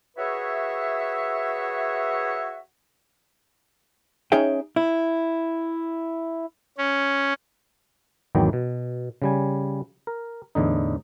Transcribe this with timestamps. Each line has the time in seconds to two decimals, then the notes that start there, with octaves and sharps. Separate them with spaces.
0.17 F#4 G#4 B4 C#5 E5
4.32 C#4 D#4 G#4 C#5 E5 G5
4.76 E4
6.78 C#4
8.35 G#1 E2 D#3 F#3 G5
8.53 B2
9.22 C#3 G3 G#5
10.07 A#4
10.55 E2 A2 D3 D#4